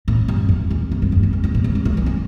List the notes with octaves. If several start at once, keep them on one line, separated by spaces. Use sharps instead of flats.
A2
G2
F2
E2
F2
G2
F2
E2
F2
G2
A2
E3
G3
A3
G3
E3